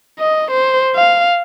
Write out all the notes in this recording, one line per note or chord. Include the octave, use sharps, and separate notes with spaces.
D#5
C5
F5